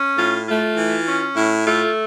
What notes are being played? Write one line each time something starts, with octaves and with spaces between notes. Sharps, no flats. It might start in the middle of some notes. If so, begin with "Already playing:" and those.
Already playing: C#4
A2 F4
A3 F4
E3
C#4
A2 E4
A3 F4